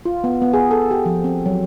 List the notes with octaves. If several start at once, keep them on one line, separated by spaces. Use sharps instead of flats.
F4
B3
B3
G#4
A4
G4
F3
C4
F#3